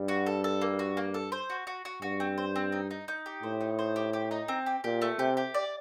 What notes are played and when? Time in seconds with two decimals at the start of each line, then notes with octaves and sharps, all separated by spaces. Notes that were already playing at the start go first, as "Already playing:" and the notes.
Already playing: G2
0.08 F#4
0.26 A4
0.44 A4
0.61 A#3
0.79 F#4
0.97 A#3
1.14 A4
1.32 C5
1.50 F#4
1.67 F#4
1.85 F#4
2.02 G2 F#4
2.20 C4
2.38 C5
2.56 C4
2.72 D#4
2.91 D#4
3.08 D#4
3.26 G4
3.43 A2 C5
3.61 D#4
3.79 C5
3.96 G4
4.13 G4
4.31 D#4
4.48 C4
4.66 G4
4.84 A#2 G4
5.02 A3
5.19 C3 G4
5.37 G4
5.54 D5